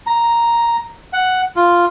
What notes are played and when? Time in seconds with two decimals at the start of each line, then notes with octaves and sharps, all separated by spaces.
0.07 A#5
1.13 F#5
1.56 F4